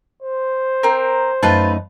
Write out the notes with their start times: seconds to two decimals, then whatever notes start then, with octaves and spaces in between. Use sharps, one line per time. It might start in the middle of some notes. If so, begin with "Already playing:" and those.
0.22 C5
0.83 C4 A#4
1.43 F#2 A3 D#4 F4 B4 A5